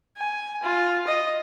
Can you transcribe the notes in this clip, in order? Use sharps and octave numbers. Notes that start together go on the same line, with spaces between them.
G#5
F4
D#5